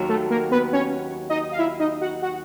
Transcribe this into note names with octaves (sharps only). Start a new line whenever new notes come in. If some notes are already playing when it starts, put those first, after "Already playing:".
Already playing: D#2 D#3 F#3
A3 A4
A#3 A#4
B3 B4
C#4 C#5
D#4 D#5
F5
E4 E5
D#4 D#5
F#4 F#5
F#4 F#5